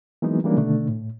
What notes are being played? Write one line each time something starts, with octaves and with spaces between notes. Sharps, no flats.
E3 F#3 G#3 A#3 B3 D#4
E3 G3 G#3 A#3 C#4 D4
B2 D3 D#3 A3 D4
A2